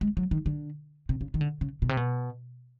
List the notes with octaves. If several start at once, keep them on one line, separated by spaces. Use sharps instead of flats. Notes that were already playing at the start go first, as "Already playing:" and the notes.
G#3
F#3
D#3
D3
C3
C#3
D#3
D3
C#3
B2
C3
B2